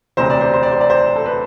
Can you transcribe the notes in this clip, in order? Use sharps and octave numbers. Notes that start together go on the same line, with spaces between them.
E1 D2 C3 C5
D5
C5
C5
D5
C5
D5
C5
A4
B4